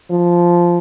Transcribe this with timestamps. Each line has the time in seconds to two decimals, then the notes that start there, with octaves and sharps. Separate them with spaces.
0.10 F3